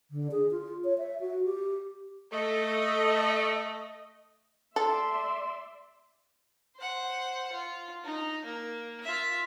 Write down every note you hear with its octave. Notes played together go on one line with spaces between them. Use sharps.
D3
G#4
F4
C#5
E5
F#4
G4
A3 D#5
A4 D5 E5 C6
C5 F#5
F4
D#4
A#3
F4 E5